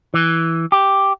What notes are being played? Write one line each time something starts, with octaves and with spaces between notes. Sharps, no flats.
E3
G4